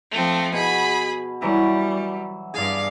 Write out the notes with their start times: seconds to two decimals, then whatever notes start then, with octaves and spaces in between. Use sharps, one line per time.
0.11 F3 A3 C4
0.53 B2 G#4 B5
1.42 E3 F#3 G3
2.54 G2 G#4 D5 F5